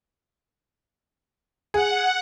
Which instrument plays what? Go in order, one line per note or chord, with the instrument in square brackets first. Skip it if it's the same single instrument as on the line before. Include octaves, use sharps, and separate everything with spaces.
[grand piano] G#4 [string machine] F#5